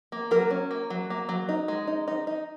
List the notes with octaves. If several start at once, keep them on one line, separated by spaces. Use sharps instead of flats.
A#3
F#3 A#4
C#4
A#3
F#3
A#3
F#3
D#4
G#3
D#4
D#4
D#4